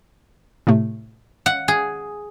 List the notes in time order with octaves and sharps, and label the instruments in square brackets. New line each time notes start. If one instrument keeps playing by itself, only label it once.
[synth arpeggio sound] A2 C3 A3
[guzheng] F#5
G#4